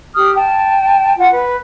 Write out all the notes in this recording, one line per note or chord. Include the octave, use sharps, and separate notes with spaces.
G4 D#6 F6
G5 A5
F4 F#5
B4